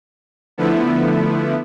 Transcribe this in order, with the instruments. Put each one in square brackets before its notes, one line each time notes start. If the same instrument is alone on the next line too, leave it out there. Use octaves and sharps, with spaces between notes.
[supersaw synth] D3 F3 A3 B3 E4